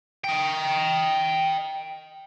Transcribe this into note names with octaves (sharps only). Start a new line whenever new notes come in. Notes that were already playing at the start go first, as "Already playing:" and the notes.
D#5 G5